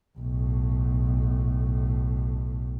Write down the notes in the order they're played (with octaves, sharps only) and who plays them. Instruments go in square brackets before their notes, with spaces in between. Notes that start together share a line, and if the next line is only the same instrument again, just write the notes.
[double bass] B1 A2